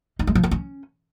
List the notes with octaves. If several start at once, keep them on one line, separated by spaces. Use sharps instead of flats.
D#4
G#3
F3
B3
C#4